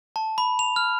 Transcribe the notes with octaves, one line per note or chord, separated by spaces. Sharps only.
A5
B5
F7
F6